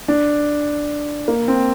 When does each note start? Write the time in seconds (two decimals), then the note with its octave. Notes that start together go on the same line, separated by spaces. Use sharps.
0.08 D4
1.28 A#3
1.48 C4